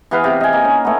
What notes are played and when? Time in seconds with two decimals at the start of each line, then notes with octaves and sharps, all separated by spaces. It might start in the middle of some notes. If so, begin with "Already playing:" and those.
0.11 E3 B3 B4 F5
0.24 C3 G5
0.40 D#5 G#5
0.53 A#3 D#4
0.64 C#4
0.85 A3 B3